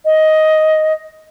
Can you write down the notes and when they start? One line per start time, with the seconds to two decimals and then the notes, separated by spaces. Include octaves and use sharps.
0.05 D#5